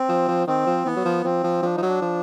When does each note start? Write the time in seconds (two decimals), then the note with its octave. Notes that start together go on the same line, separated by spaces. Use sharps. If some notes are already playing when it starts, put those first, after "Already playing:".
Already playing: C4
0.09 F3
0.28 F3
0.47 D#3 C4
0.66 F3
0.85 E3 B3
0.96 F#3
1.05 F3
1.24 F3 C4
1.44 F3
1.63 F3 D4
1.75 F3 D#4
1.83 F#3 D4
2.02 F3